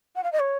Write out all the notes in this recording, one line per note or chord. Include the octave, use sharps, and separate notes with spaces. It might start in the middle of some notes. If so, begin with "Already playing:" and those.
F#5
F5
D#5
C#5